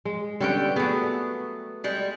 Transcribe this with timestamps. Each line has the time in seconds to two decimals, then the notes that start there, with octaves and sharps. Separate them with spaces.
0.05 G#3
0.41 D3 G3 B3 C#4 G5
0.76 F#3 A3 B3 F#4 G#4
1.84 G3 G#3